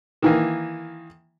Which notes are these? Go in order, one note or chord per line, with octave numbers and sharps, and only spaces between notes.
D#3 E3 A#3